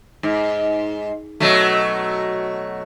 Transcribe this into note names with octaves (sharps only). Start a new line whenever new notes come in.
G#2
B2 F#3 A3